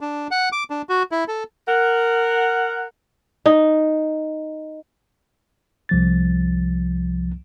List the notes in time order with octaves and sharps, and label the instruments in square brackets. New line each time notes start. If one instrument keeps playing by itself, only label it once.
[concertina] D4
F#5
D6
D4
F#4
E4
A4
[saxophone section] A#4 F#5
[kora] D#4
[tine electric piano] C2 F3 A6